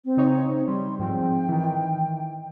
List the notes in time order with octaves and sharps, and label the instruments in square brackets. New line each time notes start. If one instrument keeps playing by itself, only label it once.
[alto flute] C4
[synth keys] C#3 D#4 C#5
[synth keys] G3 [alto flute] C6
[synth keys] G#2 F3 C4 [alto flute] G5
[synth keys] D#3 E3